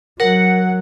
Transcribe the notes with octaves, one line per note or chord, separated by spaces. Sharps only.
F#3 A#4 F#5